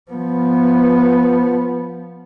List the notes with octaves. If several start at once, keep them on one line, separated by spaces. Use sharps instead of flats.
F3 B3